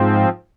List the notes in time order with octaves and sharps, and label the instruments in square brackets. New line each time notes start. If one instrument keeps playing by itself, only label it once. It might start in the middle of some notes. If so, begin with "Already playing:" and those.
Already playing: [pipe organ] G#2 F3 C4